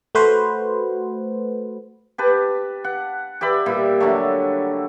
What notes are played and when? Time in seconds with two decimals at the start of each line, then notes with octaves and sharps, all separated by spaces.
0.15 A3 F#4 B4 C5
2.18 G4 B4 A5
2.84 F#5
3.41 G4 D5 E5 B5
3.66 A#2 G3 E4
4.00 D3 F#3 G3 A3